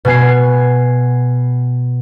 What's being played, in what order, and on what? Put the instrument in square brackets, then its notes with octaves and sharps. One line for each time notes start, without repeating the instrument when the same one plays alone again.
[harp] B2 B3 G#5 C7